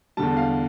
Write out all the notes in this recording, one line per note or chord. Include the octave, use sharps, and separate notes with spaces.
E2 D3 G3 A5
F5